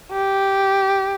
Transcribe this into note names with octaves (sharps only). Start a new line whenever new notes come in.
G4